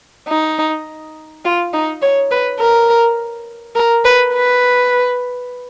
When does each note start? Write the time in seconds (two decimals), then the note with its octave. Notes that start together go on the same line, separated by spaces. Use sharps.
0.29 D#4
1.45 F4
1.74 D#4
2.02 C#5
2.31 B4
2.60 A#4
3.76 A#4
4.05 B4
4.34 B4